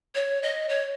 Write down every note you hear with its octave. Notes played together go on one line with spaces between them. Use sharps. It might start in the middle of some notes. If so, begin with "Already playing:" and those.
C#5
D#5
C#5